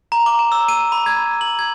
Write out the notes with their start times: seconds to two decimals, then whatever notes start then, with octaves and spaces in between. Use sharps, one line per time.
0.12 A#5
0.26 D6
0.39 E7
0.52 E6
0.68 D#7
0.92 B5
1.06 G#6
1.41 F#7
1.59 G#6